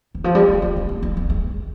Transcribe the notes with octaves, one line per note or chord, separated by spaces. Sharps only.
D#3
F3
G3
G#3
G#3
G#3
A#3
G#3
G3
G#3